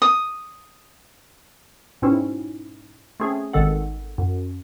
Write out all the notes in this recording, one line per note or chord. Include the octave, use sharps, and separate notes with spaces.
D#6
G#2 B2 C4 C#4 E4
A3 C4 C#4 G#4
G#1 D#3 A4 F#5
F#2